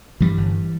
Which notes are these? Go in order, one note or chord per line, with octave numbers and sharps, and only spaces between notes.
G2 E3 G3
G1